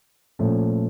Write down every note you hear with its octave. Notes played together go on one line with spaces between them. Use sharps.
A#2 F3 A3 C#4